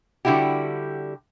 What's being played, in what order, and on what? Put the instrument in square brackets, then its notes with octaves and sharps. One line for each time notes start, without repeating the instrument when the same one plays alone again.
[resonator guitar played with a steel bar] D3 G3 E4 F#4 G4